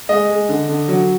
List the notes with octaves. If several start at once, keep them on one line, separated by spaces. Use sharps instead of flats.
G#3 D#5
G#3
D3
D3
F#3